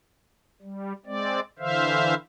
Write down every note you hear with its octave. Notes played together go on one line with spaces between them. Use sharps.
G3
G#3 C4 D5
D3 E3 C5 E5 F5